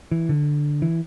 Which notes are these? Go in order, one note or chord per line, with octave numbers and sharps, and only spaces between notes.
E3
D3
E3